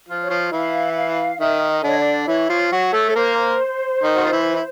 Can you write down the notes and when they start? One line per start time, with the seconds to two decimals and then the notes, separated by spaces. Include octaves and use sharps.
0.09 F3 F4
0.23 C#5
0.30 F3 F4
0.52 E3 E4 F5
0.91 F#5
0.96 F5
1.39 D#3 D#4 E5
1.70 D#5
1.83 D3 D4 C#5
1.98 D5
2.27 E3 E4 C#5
2.49 F3 F4
2.72 F#3 F#4 C#5
2.93 A3 A4
3.09 A4
3.16 A#3 A#4 C5
4.03 D#3 D#4
4.16 F#4
4.25 F4
4.32 E3 E4
4.55 E4